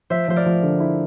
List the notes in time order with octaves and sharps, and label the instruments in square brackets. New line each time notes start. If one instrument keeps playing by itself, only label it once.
[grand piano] F3 [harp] C5 E5
[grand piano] F3 [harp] C5
[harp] A#4 D5
[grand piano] F3
D3
E4